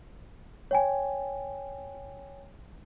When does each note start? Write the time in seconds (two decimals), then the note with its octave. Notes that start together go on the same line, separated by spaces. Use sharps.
0.71 C#5 G5 G#5